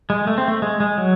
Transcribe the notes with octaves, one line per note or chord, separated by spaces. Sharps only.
G#3
A3
C4
A3
G#3
G#3
F#3